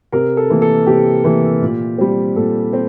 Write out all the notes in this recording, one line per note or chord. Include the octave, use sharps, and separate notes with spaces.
C3 A#4
A4
E3 A#3
A4
C3 G4
E3 A#3
A#2
G3 C4
A#2 A4
C4